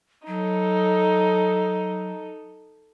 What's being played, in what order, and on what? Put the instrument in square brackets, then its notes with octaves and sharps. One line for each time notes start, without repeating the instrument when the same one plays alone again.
[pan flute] F#3 [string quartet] D#4 A4